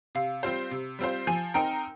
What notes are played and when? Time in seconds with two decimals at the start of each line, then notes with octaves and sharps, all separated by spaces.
0.15 C3 F5
0.43 G3 C4 F4 C5
0.71 C3
0.99 G3 C4 F4 C5
1.27 F3 G#5
1.54 C4 D#4 A#4 G5